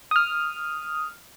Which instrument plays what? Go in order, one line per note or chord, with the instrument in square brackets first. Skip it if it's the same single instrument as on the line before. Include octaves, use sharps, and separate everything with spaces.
[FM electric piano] D#6 F6